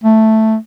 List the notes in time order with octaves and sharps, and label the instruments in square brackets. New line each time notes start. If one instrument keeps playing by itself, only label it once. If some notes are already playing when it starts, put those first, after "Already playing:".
[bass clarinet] A3